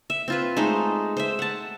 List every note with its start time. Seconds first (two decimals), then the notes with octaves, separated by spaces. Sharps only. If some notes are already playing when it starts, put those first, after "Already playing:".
0.10 E5
0.28 C4 F4 B4
0.57 G#3 A3 D#4 C5
1.17 C5 E5
1.39 F#5 A5